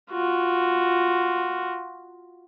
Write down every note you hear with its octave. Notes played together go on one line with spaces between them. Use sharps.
F4 F#4